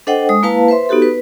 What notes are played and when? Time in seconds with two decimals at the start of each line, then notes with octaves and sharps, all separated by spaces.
0.07 D4 A4 C5 D#5 F#5 G5
0.29 G#3 D#6
0.43 A#3 E4 B4 F5 A5
0.68 B4 C5 E5 C6
0.89 B3 D#4 F#4 G4 A4
1.02 B4